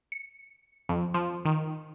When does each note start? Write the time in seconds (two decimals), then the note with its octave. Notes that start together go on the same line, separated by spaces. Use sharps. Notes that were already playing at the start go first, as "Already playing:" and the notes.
0.12 C#7
0.89 F2
1.14 F3
1.45 D#3